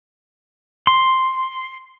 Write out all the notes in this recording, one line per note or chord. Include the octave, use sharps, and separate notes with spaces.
C6